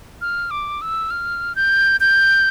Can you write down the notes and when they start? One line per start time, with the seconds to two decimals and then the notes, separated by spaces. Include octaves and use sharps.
0.21 F6
0.51 D6
0.82 E6
1.11 F6
1.56 G6
2.00 G6